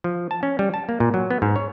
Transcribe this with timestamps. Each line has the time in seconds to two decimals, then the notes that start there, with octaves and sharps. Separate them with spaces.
0.04 F3
0.31 A5
0.43 C#4
0.59 G3
0.74 A5
0.89 A#3
1.00 A#2
1.14 F#3
1.31 B3
1.42 G#2
1.56 C#5